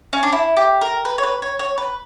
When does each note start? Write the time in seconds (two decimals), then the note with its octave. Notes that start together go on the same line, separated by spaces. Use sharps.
0.13 C#4
0.23 D4
0.32 E4
0.57 G4
0.81 A#4
1.05 B4
1.18 C#5
1.23 B4
1.42 C#5
1.59 C#5
1.78 B4